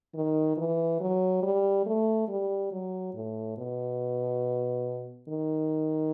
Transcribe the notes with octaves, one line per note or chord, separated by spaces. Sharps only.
D#3
E3
F#3
G3
A3
G3
F#3
A2
B2
D#3